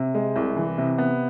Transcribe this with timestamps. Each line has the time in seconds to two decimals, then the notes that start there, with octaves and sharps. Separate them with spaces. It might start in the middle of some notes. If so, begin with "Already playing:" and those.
Already playing: C3
0.14 G#3
0.36 C2
0.57 E3
0.78 C3
0.98 B3